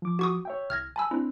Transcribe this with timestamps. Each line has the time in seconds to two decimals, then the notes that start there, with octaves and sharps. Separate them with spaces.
0.02 F3 D6
0.19 F#4 C#6 D#6
0.45 C#5 E5 G5
0.70 C2 F6 G#6 A#6
0.96 G#5 A5 B5 E6
1.11 C4 D4 E4